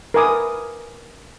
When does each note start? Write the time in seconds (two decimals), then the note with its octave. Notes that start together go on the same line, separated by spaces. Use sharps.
0.14 A#4 B4 E5 G#5 D6 D#6